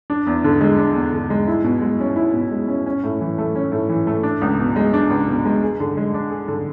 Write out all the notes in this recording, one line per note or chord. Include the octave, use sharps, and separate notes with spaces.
D4
E2
D3
G#3
D4
E2
D3
G#3
E4
B2
G#3
C#4
E4
B2
G#3
C#4
C#4
A2
E3
A3
C#4
A2
E3
A3
D4
C#2
B2
G#3
D4
C#2
B2
G#3
G#4
D3
G#3
D4
G#4
D3